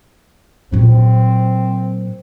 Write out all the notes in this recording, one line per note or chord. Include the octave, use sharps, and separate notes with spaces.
A#2 F#3 C4